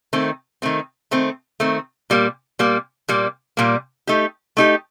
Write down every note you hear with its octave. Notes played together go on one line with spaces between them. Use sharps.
D#3 A3 C4
D#3 A3 C4
D#3 A3 C4
D#3 A3 C4
A#2 G3 A#3
A#2 G3 A#3
A#2 G3 A#3
A#2 G3 A#3
A3 D#4 G4
A3 D#4 G4